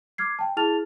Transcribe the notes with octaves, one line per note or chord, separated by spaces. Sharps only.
D6 F6 G#6 C7
G5 A5
E4 G#4 A5 F6 A6 F7